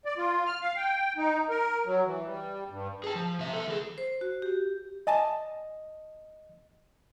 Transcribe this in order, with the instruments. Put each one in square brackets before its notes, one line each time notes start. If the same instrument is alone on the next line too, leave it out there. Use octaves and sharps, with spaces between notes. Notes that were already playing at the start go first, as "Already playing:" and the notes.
[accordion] D5
F4
F6
F5
G5
D#4
A#4
F#3
E3
G3
G2
[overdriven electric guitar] G#4 A5
F3
C3 E5
B3 A4
E3 G#4
[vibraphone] C5
F#4
G4
[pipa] D5 G#5 A5 [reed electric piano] D#5